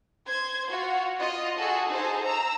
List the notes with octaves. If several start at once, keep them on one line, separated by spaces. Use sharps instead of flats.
C5 G#6
F4 F#4
F4 D#5
F#4 G#4 A4
D#4 G#4 A4 C5
A#5 E6